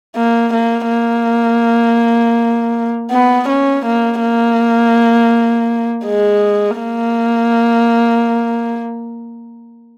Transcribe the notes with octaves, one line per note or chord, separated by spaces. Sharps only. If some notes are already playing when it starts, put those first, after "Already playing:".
A#3
A#3
A#3
B3
C#4
A#3
A#3
G#3
A#3